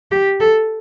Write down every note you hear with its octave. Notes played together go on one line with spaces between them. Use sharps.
G4
A4